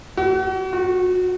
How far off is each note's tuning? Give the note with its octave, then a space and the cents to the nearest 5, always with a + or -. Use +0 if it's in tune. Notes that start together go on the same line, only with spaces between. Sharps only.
F#4 +35
F#4 -25